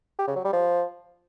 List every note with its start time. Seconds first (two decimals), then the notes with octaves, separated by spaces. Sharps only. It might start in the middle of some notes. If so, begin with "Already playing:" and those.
0.19 G4
0.27 C#3
0.36 F#3
0.44 G3
0.53 F3